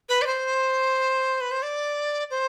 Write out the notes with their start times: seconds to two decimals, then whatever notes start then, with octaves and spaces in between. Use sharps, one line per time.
0.09 B4
0.22 D5
0.26 C5
1.41 B4
1.51 C5
1.62 D5
2.30 C5